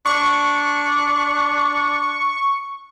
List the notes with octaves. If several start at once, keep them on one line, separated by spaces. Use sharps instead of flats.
D4 C#6